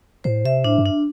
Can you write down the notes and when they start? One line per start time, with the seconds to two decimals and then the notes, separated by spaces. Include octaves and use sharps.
0.24 A2 C5
0.45 C3 E5
0.64 A2 D4
0.78 G2
0.86 D4